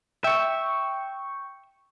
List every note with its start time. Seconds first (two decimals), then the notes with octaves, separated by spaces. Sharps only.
0.24 E5 G5 C#6